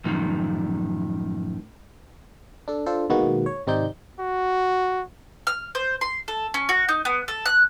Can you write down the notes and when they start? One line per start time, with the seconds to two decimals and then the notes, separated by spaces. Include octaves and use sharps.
0.05 F#2 A2 D#3 F3
2.68 D4 A4
2.86 D4 F4 A4 C5
3.10 B2 D#3 G#3 A#3 B3 F#4
3.46 C#5
3.67 G#1 C3 C4 D#4 D5 G6
4.19 F#4
5.47 F6
5.75 C5
6.01 C6
6.28 A4
6.54 C#4
6.69 F#4
6.89 D#4
7.05 B3
7.28 A4
7.46 F#6